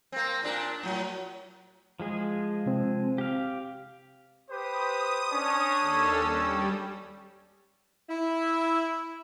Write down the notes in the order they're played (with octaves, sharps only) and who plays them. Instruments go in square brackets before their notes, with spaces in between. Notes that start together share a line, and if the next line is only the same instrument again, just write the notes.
[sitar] A#3 C4
A#2 D4 A#4
A2 F#3
[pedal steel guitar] F3 G#3 G#4
[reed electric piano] C3 C4
[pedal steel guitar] G4 F5
[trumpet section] G4 B4 C5 [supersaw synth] D#6
[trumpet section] C#4 D4
[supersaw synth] D#2 A4 E6
G3
[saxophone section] E4